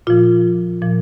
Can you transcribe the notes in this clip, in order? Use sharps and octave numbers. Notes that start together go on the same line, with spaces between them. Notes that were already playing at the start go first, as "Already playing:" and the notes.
A#2 F3 F4
A#2 F3